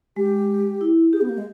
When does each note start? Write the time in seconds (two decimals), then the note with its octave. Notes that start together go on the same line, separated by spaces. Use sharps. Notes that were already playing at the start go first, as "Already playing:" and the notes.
0.16 G#3 G4
0.81 E4
1.13 G4 G#4
1.21 B3
1.29 A#3
1.38 G#3